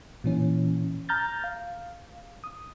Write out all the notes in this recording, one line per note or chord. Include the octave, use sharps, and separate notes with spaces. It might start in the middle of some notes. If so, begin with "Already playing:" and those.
A#2 E3 C#4
A#5 F6 G6 A6
F5
D#6